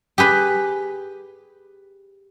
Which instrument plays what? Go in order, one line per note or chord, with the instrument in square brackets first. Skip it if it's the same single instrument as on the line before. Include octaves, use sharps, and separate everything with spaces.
[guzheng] G4 G#4 B4 B5